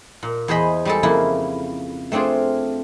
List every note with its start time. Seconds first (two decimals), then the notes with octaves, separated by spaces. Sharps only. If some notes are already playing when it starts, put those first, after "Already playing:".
0.23 A#2
0.48 E2 G#4 C5 D#5 B5
0.85 G3 G#3 A4
1.03 F2 C#3 A#3 E4
2.12 A3 C4 D4 F4 G#4